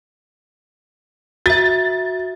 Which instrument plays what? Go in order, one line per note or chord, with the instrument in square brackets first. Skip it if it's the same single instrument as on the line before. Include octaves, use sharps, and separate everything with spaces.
[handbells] F#4 E5 [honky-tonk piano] A6